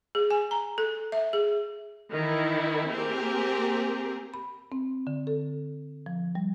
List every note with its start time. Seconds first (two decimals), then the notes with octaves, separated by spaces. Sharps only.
0.15 G#4
0.31 G#5
0.51 A#5
0.78 A4
1.12 E5
1.33 G#4
2.12 D#3 E3 E4
2.91 A#3 C4 G4 G#4 A#4
4.34 B5
4.72 C4
5.07 D3
5.27 A4
6.06 F3
6.35 G3